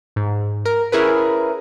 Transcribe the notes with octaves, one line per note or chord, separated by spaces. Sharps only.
G#2
A#4
C#4 E4 G#4 A#4 B4